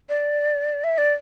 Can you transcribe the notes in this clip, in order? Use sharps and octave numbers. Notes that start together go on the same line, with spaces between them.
D5
E5
D5